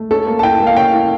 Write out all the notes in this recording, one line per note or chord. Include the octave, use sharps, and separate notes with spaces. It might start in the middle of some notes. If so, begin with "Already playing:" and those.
Already playing: A3
C#4 A4
A#3
A5
E4 G5
A#3
F5
C#4 G5
E4